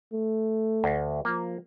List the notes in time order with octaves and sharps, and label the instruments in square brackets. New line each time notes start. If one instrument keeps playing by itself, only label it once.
[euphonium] A3
[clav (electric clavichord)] D2
[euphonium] F3 [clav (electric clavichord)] A#3